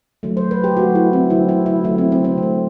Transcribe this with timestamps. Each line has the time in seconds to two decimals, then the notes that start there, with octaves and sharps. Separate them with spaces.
0.23 D3 F#3 A3
0.37 C5
0.51 B4
0.64 G4
0.77 D3 F#3 A3 F#4
0.95 E4
1.13 C4
1.30 D3 F#3 A3 E4
1.49 E4
1.66 E4
1.84 D3 F#3 A3 E4
1.98 C4
2.12 C4
2.25 C4
2.37 D3 A3